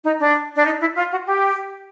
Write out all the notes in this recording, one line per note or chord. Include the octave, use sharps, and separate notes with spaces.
D#4
D4
D4
D#4
E4
F4
F#4
G4